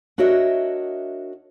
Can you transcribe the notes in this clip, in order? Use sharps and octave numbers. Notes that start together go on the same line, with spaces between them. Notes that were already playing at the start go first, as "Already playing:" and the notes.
D4 F#4 A#4 C#5 D#5 E5